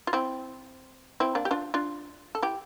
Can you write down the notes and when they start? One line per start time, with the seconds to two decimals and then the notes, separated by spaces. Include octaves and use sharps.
0.07 F4
0.13 C4 E4
1.20 C4 E4
1.35 A#3 D4
1.45 G4
1.51 D4 F4
1.74 D4 F4
2.35 A4
2.42 E4 G4